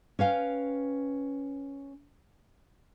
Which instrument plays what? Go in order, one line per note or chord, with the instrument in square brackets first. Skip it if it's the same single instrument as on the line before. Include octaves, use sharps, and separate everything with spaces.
[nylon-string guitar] C#4 B4 F5 G5